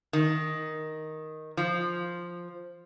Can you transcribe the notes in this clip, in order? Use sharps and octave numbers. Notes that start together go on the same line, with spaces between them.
D#3
F3